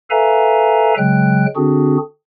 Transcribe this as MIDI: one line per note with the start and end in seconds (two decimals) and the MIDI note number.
0.10 0.94 69
0.10 0.94 71
0.10 0.94 76
0.10 0.94 77
0.10 0.94 80
0.10 0.94 82
0.98 1.46 49
0.98 1.46 54
0.98 1.46 56
0.98 1.46 79
0.98 1.46 90
1.56 1.97 50
1.56 1.97 60
1.56 1.97 62
1.56 1.97 66
1.56 1.97 68